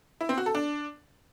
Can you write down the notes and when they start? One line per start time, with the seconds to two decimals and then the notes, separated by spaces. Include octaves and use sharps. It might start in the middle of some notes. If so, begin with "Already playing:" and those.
0.21 E4
0.29 C4
0.38 F#4
0.46 A4
0.55 D4